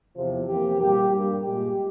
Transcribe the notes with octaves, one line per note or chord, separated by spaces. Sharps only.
E2 C3 F3
F2 E3 A#3 G4
A#2 G3 A#3 G4
G2 G3 A#3
A#2 G#3 G4